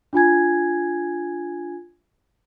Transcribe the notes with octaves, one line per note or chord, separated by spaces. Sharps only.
D4 F4 G#5 G#6